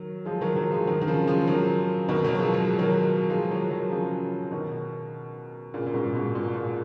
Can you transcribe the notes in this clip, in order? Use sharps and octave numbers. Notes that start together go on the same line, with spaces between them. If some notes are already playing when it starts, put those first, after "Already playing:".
Already playing: D#3 F#3
F3 G#3
D#3 F#3
D#3 F#3
F3 G#3
D#3 F#3
D#3
C#3 F3
F3 G#3
D#3 F#3
B2 D#3
D#3 F#3
F3 G#3
F#3
G#3
D#3 F#3
F3 G#3
D#3 F#3
D#3 F#3
C#3 F3
B2 D#3
A#2 C#3
A#2
G#2 B2
G#2 B2
A#2
A#2